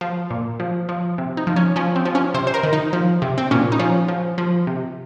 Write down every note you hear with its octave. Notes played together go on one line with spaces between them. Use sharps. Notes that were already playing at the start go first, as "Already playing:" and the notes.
F3
A#2
F3
F3
C3
D#4
F3
C#4
F3 C#4
C4
F3
C#4
C3 C5
C5
A#4
D#3
D#4
F3
C3
C4
A#2 C#4
D#4
F3 C#4
F3
F3
C3